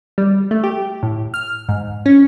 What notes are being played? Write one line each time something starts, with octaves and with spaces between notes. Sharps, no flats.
G3
A3
G4
A2
F6
G#2
C#4